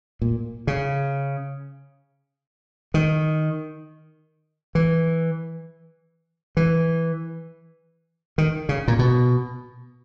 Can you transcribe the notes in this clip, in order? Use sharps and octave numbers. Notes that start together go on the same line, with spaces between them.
A#2
C#3
D#3
E3
E3
D#3
C#3
A#2
B2